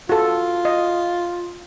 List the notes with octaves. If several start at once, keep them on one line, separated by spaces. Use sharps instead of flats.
F4 F#4 A4
D#5